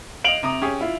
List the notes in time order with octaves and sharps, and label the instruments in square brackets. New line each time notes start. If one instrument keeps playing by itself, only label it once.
[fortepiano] D#5 F5 [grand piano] D7 F7 F#7
[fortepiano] C3 A#5 D#6
C#4 G4 G#4
E4 F4